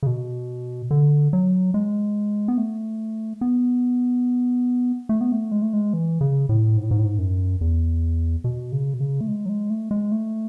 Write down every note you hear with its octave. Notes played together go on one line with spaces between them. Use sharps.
C#3
B2
D3
F#3
G#3
B3
A3
B3
A3
B3
A3
G#3
A3
G#3
E3
C#3
A2
G#2
A2
G#2
A2
G#2
F#2
E2
B2
C#3
B2
C#3
A3
G#3
F#3
G#3
A3
G#3
A3